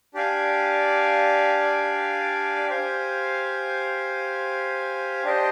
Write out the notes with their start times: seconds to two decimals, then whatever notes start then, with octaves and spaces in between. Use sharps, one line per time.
0.14 D4 G4 D5 F5 G#5
2.69 G4 C5 F5 G#5
5.24 D4 G4 C5 D#5